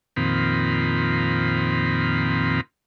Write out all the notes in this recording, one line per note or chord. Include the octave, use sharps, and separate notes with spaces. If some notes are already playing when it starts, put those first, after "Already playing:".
F2 A#2 D#3 C4 B5